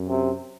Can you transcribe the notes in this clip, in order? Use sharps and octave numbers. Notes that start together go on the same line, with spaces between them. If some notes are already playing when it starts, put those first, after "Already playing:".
Already playing: F#2
C3